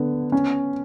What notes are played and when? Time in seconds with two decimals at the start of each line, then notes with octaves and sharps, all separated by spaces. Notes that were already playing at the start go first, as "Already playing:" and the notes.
Already playing: D3 B3
0.32 C#4